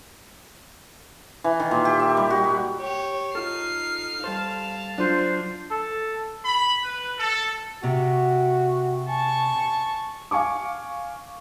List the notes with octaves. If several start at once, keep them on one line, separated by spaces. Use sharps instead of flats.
E3
D#3
A#2
G4
E5
G3
F#4
G3
G4 C#5
D#4 F4 A4 F6 C7
G3 A4 C5 F5 A5
F#3 D4 F4 C5
A4
B5
B4
A4
C3 F#4
G#5 A5 C#6
F5 G#5 C#6 D6